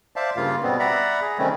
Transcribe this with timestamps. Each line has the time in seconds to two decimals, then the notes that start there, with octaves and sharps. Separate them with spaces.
0.16 C5 D5 E5 F5 A5
0.36 G2 C#3 A#3 F4 F5
0.63 B2 G3 B3 C4
0.79 D5 E5 F#5 A#5 B5
1.21 G#4
1.38 C3 D#3 G3 A3 C4 C#4